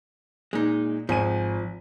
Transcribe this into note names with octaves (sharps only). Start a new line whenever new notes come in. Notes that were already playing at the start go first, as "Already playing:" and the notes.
A#2 G#3 D#4
G#1 F3 G#5 D#7